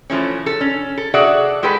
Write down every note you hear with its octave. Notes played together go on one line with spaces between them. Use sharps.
E3 F3 A3 C#4
A4
C#4
A4
F#4 G#4 A4 D5 E5 F#5
G#3 G4 A4 B4